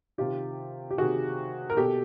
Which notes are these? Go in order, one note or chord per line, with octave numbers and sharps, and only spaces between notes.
C3 D#3 F4 G4
G4
C3 D#3 F#4 G#4
A#4
B2 G4 A4